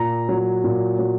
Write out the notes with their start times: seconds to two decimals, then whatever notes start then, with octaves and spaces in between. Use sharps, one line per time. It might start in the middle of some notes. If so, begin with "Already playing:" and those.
Already playing: A#2 A#5
0.29 F#3
0.64 A#2
0.99 F#3